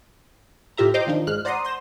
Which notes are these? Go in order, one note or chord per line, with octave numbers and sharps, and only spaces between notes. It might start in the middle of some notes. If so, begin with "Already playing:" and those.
A2 F4 G4 E5 A#5
C5 D#5 G5 A#5 C6 D6
D#3 F3 D4 D#4
G#1 G#3 F6 F#6
C5 D5 F#5 A#5 C6 D#6
C6 G6 A#6 E7